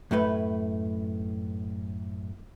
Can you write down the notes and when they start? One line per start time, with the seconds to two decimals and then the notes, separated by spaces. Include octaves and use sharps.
0.11 F#2 A2 A3 B4